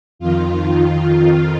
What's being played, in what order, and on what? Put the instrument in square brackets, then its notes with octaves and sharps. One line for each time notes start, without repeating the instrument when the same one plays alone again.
[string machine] F2 D#3 F4